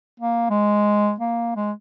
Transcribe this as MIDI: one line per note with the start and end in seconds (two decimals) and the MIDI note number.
0.20 0.50 58
0.50 1.14 56
1.20 1.55 58
1.56 1.72 56